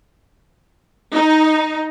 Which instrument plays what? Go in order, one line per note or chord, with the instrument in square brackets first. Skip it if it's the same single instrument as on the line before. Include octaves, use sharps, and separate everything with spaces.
[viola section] D#4